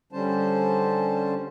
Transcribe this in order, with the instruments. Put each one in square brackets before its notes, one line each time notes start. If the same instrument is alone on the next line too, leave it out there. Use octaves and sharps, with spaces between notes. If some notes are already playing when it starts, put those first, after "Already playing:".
[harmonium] D3 G3 C#4 C5 A5